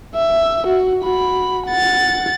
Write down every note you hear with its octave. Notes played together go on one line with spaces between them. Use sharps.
E5
F#4
F#4 B5
F#5 A6